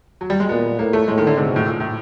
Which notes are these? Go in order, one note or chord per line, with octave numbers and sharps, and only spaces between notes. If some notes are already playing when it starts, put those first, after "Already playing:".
F#3
G3
G#3
A#2 B3
A2 A#3
A3
A2 G#3
D#3
D3
G#2 C3
B2
A2
A#2
A2